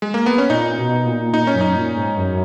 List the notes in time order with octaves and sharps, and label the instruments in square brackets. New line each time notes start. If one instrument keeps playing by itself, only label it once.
[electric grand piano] G#3
A#3
B3
C#4
[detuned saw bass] A#2 [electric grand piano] D#4
[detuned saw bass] B2
A#2
[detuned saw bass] A#2 [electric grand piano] D#4
[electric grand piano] C#4
[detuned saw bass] F#2
[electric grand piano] D#4
[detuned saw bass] A#2
G#2
F#2